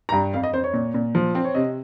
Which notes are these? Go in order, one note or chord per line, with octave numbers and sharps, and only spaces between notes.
A#5
G2
F2 F5
D#5
F2 C5
C#5
A#2
A#2
F3
C4
C#5
C3 D#5